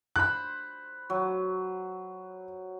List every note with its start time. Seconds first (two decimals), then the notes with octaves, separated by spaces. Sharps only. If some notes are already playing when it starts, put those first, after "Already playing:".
0.16 C5 B5 F#6
1.10 F#3